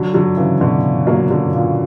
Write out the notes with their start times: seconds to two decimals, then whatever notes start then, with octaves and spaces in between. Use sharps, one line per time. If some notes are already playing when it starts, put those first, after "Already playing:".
Already playing: D3 F#3
0.14 D3 F#3
0.37 C#3 E3
0.61 B2 D3
1.07 F#3 A#3
1.30 D3 F#3
1.54 A#2